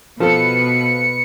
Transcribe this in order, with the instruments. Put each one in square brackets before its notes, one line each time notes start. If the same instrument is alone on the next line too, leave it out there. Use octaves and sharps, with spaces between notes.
[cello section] B2 B4 [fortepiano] F3 A4 [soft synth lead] C#7